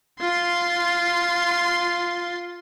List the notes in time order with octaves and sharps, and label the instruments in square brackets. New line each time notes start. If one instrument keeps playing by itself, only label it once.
[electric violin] F4 C6